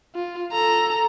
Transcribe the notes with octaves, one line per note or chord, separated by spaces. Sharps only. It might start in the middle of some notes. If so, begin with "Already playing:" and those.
F4
A4 A#5